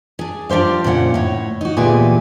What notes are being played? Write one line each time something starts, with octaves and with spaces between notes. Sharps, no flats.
D4 G#4
F3 D4 G4 C5 F5
F2 A#2 C#3 F#5
A2 C#5
D#4 F#4
D2 A#2 E3 B3 G4 G#4